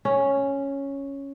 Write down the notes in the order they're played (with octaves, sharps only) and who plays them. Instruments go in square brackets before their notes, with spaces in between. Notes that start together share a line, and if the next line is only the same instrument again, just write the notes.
[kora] C#4